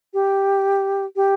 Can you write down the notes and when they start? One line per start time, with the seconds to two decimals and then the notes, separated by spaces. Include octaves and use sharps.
0.14 G4
1.16 G4